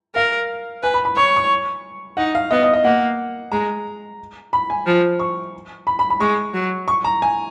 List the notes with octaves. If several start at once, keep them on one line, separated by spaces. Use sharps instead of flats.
A#4 F5
B4 G#5
B5
B5
C#5 C#6
C#6
D#4 F#5
F5
B3 D#5
D#5
D#5
A#3 F#5
G#3 A#5
B5
G#5
F3
C#6
B5
B5
B5
G#3 C#6
F#3
C#6
A#5
G#5